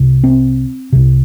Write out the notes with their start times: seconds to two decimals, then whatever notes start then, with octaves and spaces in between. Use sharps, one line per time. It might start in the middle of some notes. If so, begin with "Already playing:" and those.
Already playing: C2 C3
0.24 C4
0.92 C2 C3